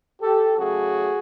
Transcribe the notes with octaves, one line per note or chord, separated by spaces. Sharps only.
G4 A4
C#3 F#3 A3 F#4 G#4